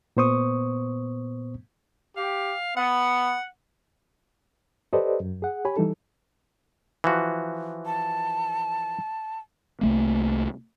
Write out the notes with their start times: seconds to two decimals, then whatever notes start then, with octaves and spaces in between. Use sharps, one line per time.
0.17 A#2 B3 C5 C#6 D#6
2.17 G4 F5
2.77 B3 F#5
4.93 G4 A4 B4 C5 D5 D#5
5.20 F#2
5.42 G#4 F#5
5.65 G4 C#5 G#5 B5
5.77 E3 G3 D#4 A4
7.04 E3 F3 F#4
7.86 A5
9.81 C2 A3 A#3